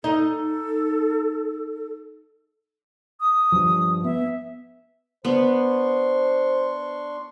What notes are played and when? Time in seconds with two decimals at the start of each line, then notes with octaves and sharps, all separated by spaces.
0.04 D#4 A4
3.20 D#6
3.52 G2 F3
4.04 B3 E5
5.25 B3 D4 C5 C6 C#6